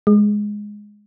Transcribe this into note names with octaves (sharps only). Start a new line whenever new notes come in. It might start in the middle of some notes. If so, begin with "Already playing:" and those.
G#3